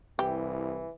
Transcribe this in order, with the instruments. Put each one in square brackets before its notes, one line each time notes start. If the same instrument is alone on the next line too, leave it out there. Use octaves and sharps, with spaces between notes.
[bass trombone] C2 [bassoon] E3 [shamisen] G4